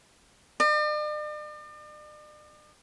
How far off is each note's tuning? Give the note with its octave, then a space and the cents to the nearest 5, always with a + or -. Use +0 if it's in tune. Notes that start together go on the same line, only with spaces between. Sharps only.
D5 +45